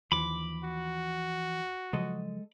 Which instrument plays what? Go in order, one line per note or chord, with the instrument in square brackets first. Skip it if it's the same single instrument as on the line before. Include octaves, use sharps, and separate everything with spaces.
[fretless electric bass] D#2 [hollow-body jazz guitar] E3 F3 [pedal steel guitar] B5 D6
[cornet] F#4
[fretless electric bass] C#3 F3 F#3 [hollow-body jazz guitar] G#3 A4 D#5